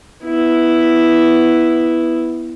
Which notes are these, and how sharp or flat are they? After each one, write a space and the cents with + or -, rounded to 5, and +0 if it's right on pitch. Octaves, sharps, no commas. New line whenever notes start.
B3 +0 E4 +0